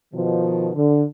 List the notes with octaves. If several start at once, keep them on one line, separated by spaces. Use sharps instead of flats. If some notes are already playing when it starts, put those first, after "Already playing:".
B2 D#3 F3
D3